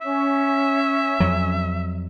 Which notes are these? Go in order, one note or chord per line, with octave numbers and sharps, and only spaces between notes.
C#4 E5
F2 F#3